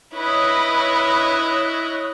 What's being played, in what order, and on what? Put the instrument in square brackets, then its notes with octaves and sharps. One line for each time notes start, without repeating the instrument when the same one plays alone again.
[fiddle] E4 [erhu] B4 [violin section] C#5 D#5 [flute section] D#6 F#6